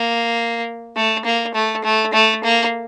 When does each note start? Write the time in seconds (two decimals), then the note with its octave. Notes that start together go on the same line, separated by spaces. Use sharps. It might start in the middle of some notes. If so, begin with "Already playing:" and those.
Already playing: A#3
0.97 A3
1.25 A#3
1.54 A3
1.84 A3
2.13 A3
2.44 A#3